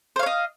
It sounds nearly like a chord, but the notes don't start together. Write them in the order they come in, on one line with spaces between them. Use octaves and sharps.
C5 F5 C#5 D#5